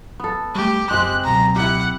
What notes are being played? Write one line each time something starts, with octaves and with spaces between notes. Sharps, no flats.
B3 A4
G3 A3 G4
F#1 G#3 C4 G4 F#6
C#2 B2 F#3 A#5
E4 G4 F#5